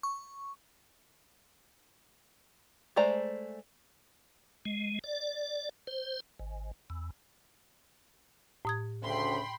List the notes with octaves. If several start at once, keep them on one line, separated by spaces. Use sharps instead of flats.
C#6
G#3 A3 C5 D5 A#5
G#3
D5
C5
G#1
E2
A2 D#6 G#6
D2 C#3 G5 B5 C6